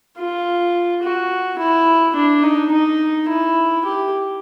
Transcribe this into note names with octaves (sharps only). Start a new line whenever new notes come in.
F4
F#4
E4
D4
D#4
D#4
E4
G4